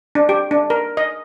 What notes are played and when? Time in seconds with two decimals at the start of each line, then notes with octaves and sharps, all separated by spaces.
0.15 D4
0.29 G4
0.51 D4
0.70 A#4
0.97 D#5